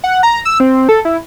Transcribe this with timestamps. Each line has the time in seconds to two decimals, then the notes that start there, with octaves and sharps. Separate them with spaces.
0.04 F#5
0.23 A#5
0.45 E6
0.60 C4
0.89 A4
1.05 E4